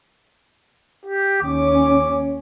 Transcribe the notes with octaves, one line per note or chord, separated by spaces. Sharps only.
G4
D#2 C#4 D6